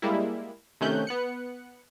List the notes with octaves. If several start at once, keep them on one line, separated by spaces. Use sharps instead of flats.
G3 G#3 A#3 E4
C3 D#3 A3 C#4 F#6 G6
B3 F#6 C#7